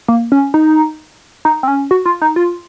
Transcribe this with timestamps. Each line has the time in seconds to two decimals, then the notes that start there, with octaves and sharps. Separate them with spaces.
0.08 A#3
0.32 C#4
0.54 D#4
1.45 D#4
1.63 C4
1.68 C#4
1.91 F#4
2.06 F4
2.22 D#4
2.36 F4